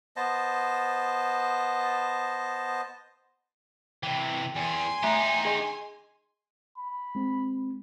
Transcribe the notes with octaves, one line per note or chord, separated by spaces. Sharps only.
B3 C5 D#5 A5
C3 E3 G5
E2 G#5 C6
A3 D#4 G4 E5 A#5
G#4 D#5
B5
G#3 C4